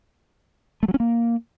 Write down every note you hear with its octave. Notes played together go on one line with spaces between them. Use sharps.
A3
F#3
C#4
A#3